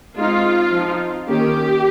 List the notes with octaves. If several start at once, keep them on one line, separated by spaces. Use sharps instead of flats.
G#3 C4 D#4 F4
F3 C4 D#4
D#3 A#3 C#4 G4